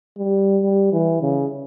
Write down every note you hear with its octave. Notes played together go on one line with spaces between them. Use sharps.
G3
G3
E3
C#3